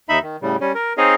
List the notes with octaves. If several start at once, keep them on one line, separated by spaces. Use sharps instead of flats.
D#2 D#4 E5 B5
D#3
A2 C#3 G3
G3 C#4
A#4
C4 D#4 G#4 C#5 D#5 F5